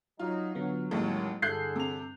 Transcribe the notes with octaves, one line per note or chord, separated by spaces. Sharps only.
F#3 D#4 F4
D3 F#3 B3
A1 D#2 G3 G#3
G2 D3 G#4 A4 F#6 G6 C7
C3 F7